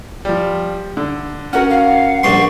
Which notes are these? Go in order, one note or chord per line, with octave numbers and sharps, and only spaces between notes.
F3 G3
D3
C#4 F#4 A#4 F#5 C#6 F6
F5 F#5
A#1 G2 C6 C#6